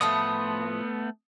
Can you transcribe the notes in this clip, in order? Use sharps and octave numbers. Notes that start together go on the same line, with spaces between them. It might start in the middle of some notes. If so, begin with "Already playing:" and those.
A2 F3 A3 B3 B4 D#6